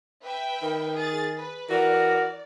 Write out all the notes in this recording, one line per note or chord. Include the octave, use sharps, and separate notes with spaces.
B4 E5 G5
D#3
G#4 A6
B4
E3 F#4 A#4 D5